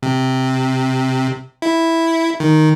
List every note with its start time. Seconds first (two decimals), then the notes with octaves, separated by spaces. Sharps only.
0.03 C3
1.62 E4
2.40 D#3